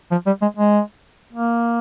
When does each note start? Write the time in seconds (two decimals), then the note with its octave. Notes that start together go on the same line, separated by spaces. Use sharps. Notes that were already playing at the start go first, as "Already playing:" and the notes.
0.11 F3
0.26 G3
0.42 G#3
0.57 G#3
1.33 A#3